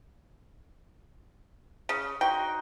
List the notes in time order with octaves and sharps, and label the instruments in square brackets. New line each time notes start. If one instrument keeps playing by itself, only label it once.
[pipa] C#3
[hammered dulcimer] D#4 F#4 C5 [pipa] G5